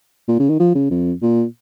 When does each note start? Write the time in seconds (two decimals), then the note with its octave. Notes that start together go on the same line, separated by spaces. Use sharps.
0.28 A#2
0.39 C#3
0.49 D#3
0.60 F3
0.75 C#3
0.91 F2
1.22 A#2